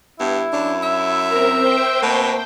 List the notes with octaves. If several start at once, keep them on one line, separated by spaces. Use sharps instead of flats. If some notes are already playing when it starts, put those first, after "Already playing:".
G2 B3 E4
F#2 D4
E5
C4 A#4
C5 G5
B2 A3 A#3